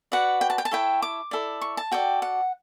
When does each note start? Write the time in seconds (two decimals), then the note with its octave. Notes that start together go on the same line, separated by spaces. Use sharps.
0.12 F#4 B4 D5 F#5
0.41 G5
0.50 A5
0.58 G5
0.65 A5
0.71 E4 A4 C#5 G5
1.02 D6
1.31 E4 A4 D5
1.61 C#6
1.77 A5
1.92 F#4 A4 D5 G5
2.22 F#5